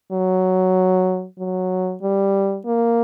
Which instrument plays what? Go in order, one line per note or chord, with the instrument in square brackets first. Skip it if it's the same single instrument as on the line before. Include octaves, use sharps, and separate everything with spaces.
[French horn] F#3
F#3
G3
A#3